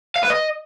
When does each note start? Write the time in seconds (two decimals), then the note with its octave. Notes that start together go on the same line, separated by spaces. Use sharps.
0.16 F5
0.23 B4
0.30 D#5